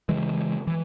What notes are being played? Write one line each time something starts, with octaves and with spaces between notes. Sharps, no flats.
C#3 E3 G#3
E3